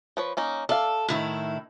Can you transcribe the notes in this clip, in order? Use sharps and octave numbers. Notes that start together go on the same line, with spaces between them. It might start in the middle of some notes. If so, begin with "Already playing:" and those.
F3 B4 C#5
A#3 C#4 D#4
A4 D5 E5 F5
A2 D#3 E4